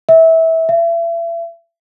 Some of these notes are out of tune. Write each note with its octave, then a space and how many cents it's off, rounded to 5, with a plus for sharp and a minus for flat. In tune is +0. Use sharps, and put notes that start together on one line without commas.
E5 -20
E5 +35